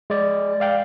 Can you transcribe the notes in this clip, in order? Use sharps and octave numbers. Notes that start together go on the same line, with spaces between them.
G#3 D5
D5 F5 G5